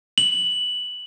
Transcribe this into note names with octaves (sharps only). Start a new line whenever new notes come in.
F#7